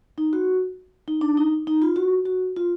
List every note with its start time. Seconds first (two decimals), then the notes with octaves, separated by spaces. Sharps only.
0.18 D#4
0.33 F#4
1.08 D#4
1.21 D4
1.37 D#4
1.67 D#4
1.82 F4
1.96 F#4
2.26 F#4
2.56 F4